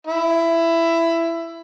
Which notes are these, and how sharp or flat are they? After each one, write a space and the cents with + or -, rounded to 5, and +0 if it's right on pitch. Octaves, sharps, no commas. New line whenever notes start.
E4 +15